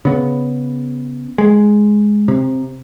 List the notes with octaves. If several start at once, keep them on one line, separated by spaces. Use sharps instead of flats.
C#3 B3
G#3
C3